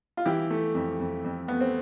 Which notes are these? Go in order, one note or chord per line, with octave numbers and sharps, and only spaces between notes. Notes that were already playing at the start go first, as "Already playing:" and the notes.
F4
E3 E4 G4
A3
F2
F2
F2
A3 B3
C4